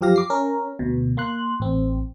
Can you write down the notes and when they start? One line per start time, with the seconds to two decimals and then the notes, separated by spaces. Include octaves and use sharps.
0.01 F#2 F3 G4 F5 A#6
0.16 D6 C7
0.30 C#4 A#4
0.79 D2 B2
1.17 A#3 C6 F#6
1.60 A1 C4